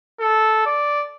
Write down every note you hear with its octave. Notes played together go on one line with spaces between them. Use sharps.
A4
D5